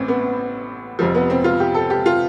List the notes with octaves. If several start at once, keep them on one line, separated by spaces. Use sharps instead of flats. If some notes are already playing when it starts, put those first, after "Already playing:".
Already playing: A1 A2 E3 C4
B3
F1 F2 C3 F3
B3
C4
F4
G4
A4
G4
F4